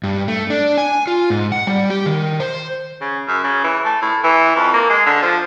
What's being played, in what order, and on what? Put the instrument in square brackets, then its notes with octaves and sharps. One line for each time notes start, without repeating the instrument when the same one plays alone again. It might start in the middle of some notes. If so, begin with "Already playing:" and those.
[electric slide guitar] G2
A3
D4
G#5
F4
G#2
F#5
G3
G4
D#3
C5
[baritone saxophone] C#3
F#2
C#3
E3
A3
A2
E3
F2
A#3
G#3
D3
F3